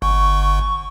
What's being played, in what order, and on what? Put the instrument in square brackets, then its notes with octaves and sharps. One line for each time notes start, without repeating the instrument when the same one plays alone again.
[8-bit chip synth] G1 [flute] C#6